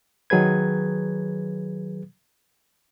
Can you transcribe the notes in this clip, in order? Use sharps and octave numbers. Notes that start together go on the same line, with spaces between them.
D#3 F#3 G#4 B4 G#6